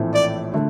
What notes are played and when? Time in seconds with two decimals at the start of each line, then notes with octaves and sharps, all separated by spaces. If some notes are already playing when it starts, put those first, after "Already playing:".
Already playing: A#1 A2 E3 A3 C4
0.14 D5
0.54 D3 A3